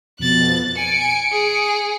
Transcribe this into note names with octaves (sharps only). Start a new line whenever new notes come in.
F2 B2 F#6 A6
G#5 C#7 D7
G#4